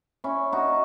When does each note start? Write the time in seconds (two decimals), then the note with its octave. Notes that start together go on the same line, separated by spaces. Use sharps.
0.24 C#4 E4
0.52 D#4 F#4